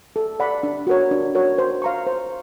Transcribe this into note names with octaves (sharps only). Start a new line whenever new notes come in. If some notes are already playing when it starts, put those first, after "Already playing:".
A4
D5 F#5 B5
D4
F#4 A#4 C#5
D4
F#4 A#4 C#5
C5
F5 A#5 C#6
C5